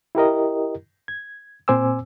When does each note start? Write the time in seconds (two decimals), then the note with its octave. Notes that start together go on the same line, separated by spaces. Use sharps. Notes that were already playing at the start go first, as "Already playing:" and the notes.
0.15 E4 G4 A#4 D#5
1.08 G#6
1.68 A#2 C4 C5 G#5 D6 E6